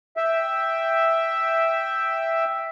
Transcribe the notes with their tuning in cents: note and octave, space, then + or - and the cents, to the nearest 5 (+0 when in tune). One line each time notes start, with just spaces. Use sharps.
E5 +0 G5 +0